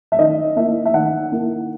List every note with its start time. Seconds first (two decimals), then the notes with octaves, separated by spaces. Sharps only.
0.12 E5
0.19 D#3 D#5
0.56 A#3 E4 E5
0.86 E5
0.94 D#3 F#5
1.32 A#3 E4